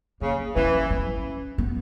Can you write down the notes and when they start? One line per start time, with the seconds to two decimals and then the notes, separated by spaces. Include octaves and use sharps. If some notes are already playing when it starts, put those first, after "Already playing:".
0.21 C#3 A#3
0.56 E3 C#4
0.91 C#4
1.58 B3